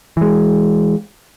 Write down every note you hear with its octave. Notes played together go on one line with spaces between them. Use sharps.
E3 G#3